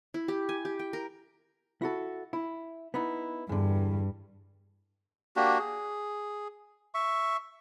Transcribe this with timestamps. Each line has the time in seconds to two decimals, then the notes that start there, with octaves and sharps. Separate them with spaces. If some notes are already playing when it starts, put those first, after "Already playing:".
0.14 E4
0.28 G4
0.49 G#5
0.65 G4
0.79 G5
0.93 A#4
1.82 E4 F#4 A4
2.33 E4
2.94 B3 D#4 E4
3.49 E2 G2 D3
5.36 A#3 D4 F#4 G4
5.59 G#4
6.94 E5 C#6